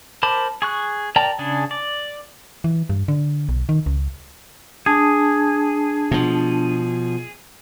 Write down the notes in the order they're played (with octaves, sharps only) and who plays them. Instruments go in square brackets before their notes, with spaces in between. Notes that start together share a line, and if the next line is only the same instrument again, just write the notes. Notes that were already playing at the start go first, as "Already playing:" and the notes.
[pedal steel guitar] A#4 C5 A5 B5 D6
G#4 C#6 F#6
A#4 D5 G5 A5 A#5
C#3 D4 G#4
D5
[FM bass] E3
G2
D3
B1
D#3
C#2
[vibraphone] D4 A5 [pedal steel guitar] G#4
[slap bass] B2 F3